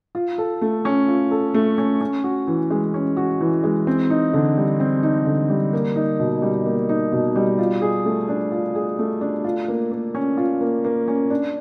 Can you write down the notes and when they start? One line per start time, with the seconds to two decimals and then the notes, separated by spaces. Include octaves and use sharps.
0.15 F4
0.38 A4
0.61 A3
0.85 C#4
1.08 F4
1.31 A4
1.54 A3
1.78 C#4
2.01 C#4
2.24 F#4
2.47 E3
2.70 G#3
2.94 C#4
3.17 F#4
3.41 E3
3.64 G#3
3.87 C4
4.10 D#4
4.33 D3
4.57 G3
4.80 C4
5.03 D#4
5.26 D3
5.49 G3
5.73 A#3
5.96 D#4
6.20 B2
6.42 G3
6.66 A#3
6.89 D#4
7.12 B2
7.36 G3
7.59 F4
7.81 G#4
8.05 A3
8.29 D4
8.52 F4
8.75 G#4
8.99 A3
9.21 D4
9.44 F4
9.68 A#3
9.91 A#3
10.15 C#4
10.37 F4
10.61 A#3
10.84 A#3
11.08 C#4
11.30 D4